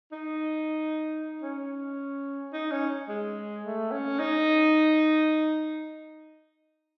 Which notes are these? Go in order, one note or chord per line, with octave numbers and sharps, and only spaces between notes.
D#4
C#4
D#4
C#4
G#3
A3
C#4
D#4